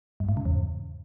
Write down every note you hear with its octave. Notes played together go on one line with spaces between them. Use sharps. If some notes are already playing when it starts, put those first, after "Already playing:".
G2
G#2
C#3
E2